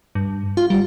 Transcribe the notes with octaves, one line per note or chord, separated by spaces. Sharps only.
G2
F4
G3